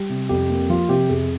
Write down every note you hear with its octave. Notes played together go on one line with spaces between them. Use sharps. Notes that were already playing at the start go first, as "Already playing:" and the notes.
Already playing: G3 G4
C3
F2 G4
A#3
F3 F4
C3 G4
F2 G#4